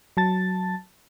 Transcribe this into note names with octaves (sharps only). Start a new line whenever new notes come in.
F#3 A5 A6